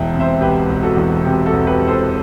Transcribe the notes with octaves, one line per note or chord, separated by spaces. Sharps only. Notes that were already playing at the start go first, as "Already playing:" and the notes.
Already playing: E1 E2 E5 G5
C3
C5 E5
E1 G4 B4
E1
F#4 A4
E2
C3 G4
F#4 A4
E1
G4 B4
E1
A4 C5